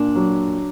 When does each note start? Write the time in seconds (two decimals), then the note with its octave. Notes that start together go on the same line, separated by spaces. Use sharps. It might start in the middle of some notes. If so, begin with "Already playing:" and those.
Already playing: A#2 D4
0.16 F#3